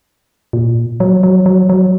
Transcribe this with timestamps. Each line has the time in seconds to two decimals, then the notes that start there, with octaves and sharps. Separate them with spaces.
0.53 A#2
1.00 F#3
1.23 F#3
1.46 F#3
1.69 F#3